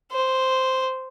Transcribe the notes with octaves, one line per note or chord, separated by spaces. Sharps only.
C5